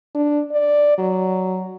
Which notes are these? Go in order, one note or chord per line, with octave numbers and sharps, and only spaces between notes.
D4
D5
F#3